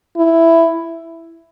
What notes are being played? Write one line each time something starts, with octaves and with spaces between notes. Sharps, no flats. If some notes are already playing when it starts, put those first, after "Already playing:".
E4